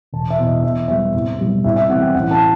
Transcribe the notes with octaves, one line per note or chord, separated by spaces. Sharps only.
E1 A5
E5
E2 B2
D#5
E2 E5
B2 G3 B3 E5
C2
B2 G3
C2 E5
E5
C3 E3 F#5
G5
A1 F#5
A5